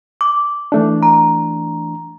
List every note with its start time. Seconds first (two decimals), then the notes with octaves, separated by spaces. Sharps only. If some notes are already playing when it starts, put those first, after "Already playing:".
0.21 D6
0.72 E3 A3 D4
1.03 A#5